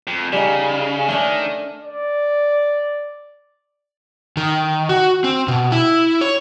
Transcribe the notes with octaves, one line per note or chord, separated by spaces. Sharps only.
F2
C#3 G3 D#4
D#3 A3 C#4 D4
D5
D#3
F#4
C4
B2
E4
C#5